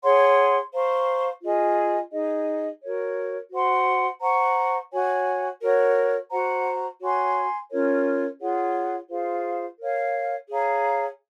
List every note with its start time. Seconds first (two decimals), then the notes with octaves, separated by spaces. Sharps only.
0.03 G#4 C#5 F#5 C6
0.73 C5 F5 A#5 C#6
1.43 F4 G#4 D#5 G#5
2.12 D#4 G#4 D#5
2.82 F#4 A#4 C#5
3.52 F#4 C5 F#5 C6
4.21 C5 F#5 A#5 C#6
4.92 F#4 C#5 G#5
5.62 F#4 A#4 C#5
6.31 F#4 C5 F#5 A#5
7.01 F#4 C#5 G#5 C6
7.71 C#4 F4 A#4 C#5
8.41 F4 G#4 C#5 F#5
9.10 F4 G#4 C5 F5
9.80 A#4 C#5 F5
10.50 G#4 C#5 F5 A#5